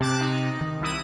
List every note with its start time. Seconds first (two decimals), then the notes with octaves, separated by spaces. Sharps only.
0.01 C3 A5 D6 F#6
0.21 D#4
0.61 D#3
0.80 C2 E4 D#6